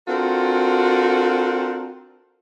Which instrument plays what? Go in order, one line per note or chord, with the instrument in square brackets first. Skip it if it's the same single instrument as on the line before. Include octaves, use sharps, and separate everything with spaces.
[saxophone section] C4 D4 F4 F#4 A4 A#4